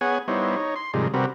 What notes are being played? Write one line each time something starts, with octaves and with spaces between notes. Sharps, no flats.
B3 G#4 C#5 F#5 G#5
G3 B3 D#4 E4 C5 C#5
D#4 C#5
C6
G#2 C3 D#3 F3 G3 G#3
C3 G3 C4 F#4 A#4 B4